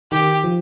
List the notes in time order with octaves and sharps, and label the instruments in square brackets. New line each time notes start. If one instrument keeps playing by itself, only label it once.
[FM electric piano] D#3 [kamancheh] G4
[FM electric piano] F3